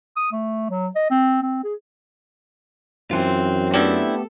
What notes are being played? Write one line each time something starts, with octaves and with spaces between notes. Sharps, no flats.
D#6
A3
F#3
D#5
C4
C4
G#4
F#2 E3 C4 F4
A3 B3 C4 D4 E4 G4 A4